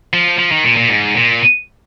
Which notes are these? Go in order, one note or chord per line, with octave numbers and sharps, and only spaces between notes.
F3
F3
D#3
A#2
A#2
G#2
A#2